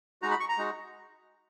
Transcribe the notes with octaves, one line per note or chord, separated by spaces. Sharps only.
G#3 D#4 F#4 A#5
B5
C#6
A#5
G#3 D#4 F#4